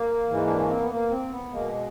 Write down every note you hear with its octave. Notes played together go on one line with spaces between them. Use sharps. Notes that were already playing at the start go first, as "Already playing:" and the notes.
Already playing: A#3
G#2 E3 G#3
D4
C#4
C4
B3
A#3
C4
B3
B2 G#3 A#3